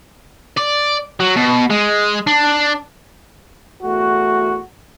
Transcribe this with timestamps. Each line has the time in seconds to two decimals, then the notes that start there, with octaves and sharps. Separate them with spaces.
0.58 D5
1.20 F#3
1.36 B2
1.70 G#3
2.27 D4
3.83 E2 A3 F#4